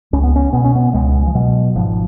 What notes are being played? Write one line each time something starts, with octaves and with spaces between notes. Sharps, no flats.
C#2 C#4
B3
C#4
B2 B3
C#4
B3
C#2 G#3
F3
B2 F#3
G#1 F3